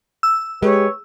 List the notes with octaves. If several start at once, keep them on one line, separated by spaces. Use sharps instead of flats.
E6
G#3 G4 B4 C#5